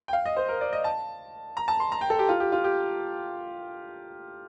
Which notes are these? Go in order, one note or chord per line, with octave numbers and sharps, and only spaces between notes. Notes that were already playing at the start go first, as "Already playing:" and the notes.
G5
F5
D#5
C5
A#4
D5
D#5
A5
A#5
A5
C6
A#5
G5
A4
G4
F4
G4
F4
G4